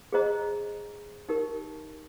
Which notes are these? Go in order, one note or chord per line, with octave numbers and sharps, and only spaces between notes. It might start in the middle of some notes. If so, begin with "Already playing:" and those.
G#4 C5 D#5 A#5
D#4 G4 A#4